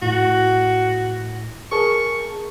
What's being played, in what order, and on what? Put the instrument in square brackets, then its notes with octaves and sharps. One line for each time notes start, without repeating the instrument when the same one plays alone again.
[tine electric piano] A2 [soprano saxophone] F#4
[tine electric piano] G#4 A#4 A5 [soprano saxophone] C#6